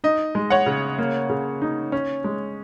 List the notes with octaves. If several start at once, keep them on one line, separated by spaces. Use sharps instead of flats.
D#4 D#5
G#3
C#5 F#5
C#3
A#3
C#3
D#4
C#4
G#3